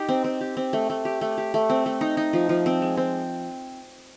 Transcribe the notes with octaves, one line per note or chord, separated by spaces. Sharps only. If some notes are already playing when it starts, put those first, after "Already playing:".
Already playing: D#4 G4
C4
C4
G4
C4
A3
A3
G4
A3
G4
A3
C4
A3
D#4
D#4
F3
F3
C4
G#3
C4